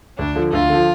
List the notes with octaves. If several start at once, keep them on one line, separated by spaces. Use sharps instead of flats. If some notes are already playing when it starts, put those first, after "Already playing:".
D2 D4
D3 F3
D2 F4
D3 F3